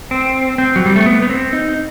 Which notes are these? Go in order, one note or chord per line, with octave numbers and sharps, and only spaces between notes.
C4
C4
F#3
G3
A3
B3
B3
C4
D#4